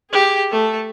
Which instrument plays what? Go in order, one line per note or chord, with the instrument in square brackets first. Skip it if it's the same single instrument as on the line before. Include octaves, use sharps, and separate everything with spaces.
[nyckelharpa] G4 G#4
A3 A4